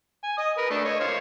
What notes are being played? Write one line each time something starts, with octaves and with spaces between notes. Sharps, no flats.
G#5
D#5 D#6
A#4 B4
A3 D4
C#5 D#5
C5 C#5 F5